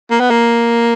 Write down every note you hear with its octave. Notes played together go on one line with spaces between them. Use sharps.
A#3
B3
A#3